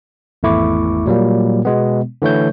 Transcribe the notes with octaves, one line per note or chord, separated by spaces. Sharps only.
G#1 E2 A3 E4 C#6 D6
A#2 F#3 G3 A#3
B2 G#3 B3
D3 E3 A3 C#5 G6